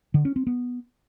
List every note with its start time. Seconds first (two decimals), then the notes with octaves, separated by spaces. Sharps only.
0.14 D3
0.25 C#4
0.36 C4
0.47 B3